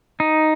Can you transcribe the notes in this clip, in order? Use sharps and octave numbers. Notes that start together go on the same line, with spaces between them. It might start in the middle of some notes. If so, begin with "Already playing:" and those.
D#4